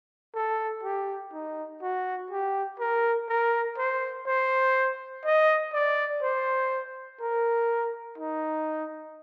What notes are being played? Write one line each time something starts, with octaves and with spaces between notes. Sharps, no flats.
A4
G4
D#4
F#4
G4
A#4
A#4
C5
C5
D#5
D5
C5
A#4
D#4